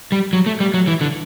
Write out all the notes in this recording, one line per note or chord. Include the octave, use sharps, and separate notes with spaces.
G3
F#3
A3
G3
F#3
E3
D3